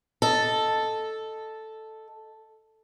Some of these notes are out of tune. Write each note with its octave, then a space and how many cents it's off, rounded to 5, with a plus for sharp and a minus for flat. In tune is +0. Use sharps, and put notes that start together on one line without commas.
A4 +0 D#5 +0